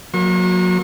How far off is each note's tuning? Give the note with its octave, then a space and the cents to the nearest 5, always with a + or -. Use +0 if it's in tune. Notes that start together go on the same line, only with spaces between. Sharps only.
F#3 -30 A#3 +0 C#6 -45